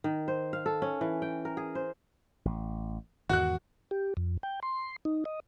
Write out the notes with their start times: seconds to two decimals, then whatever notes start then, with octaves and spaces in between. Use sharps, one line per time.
0.04 D#3
0.28 C5
0.53 F5
0.66 A4
0.82 C#4
1.01 E3
1.22 G5
1.45 A#4
1.57 G#4
1.75 C5
2.45 A1
3.29 E2 G#2 D#3 F#4 F#6
3.91 G4
4.17 F2
4.43 G5
4.63 C6
5.05 D#4
5.25 D#5